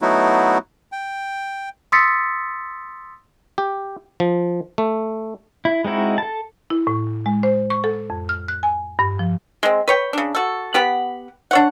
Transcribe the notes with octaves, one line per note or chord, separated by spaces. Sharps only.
F#3 A3 B3 D#4 E4 F#4
G5
C6 D#6 E6 A6 B6 C#7
G4
F3
A3
E4
G#3 C4 D#4 E4 F#4
A4 A5
E4
A2
G#3
C5
C#6
A4
F2
F6
F#6
G#5
G2
F3
G#3 C4
B4 C#5 G5
C#3 D4
F#4 A4
B3 G4 F#5 B5
D4 C#5 F#5